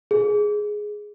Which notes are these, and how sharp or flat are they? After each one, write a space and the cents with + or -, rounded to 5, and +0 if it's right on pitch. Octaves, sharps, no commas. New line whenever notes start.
G#4 +5